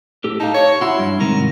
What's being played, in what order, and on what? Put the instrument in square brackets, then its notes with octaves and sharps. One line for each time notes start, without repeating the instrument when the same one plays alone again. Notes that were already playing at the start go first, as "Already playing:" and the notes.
[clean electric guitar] A2 G4 A4
[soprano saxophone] D#4 [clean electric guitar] F5 A5
[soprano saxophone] C#5
[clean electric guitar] E4 F#4 [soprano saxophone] C6
[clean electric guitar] G2
[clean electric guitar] G#2 C3 D#3 [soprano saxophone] A#5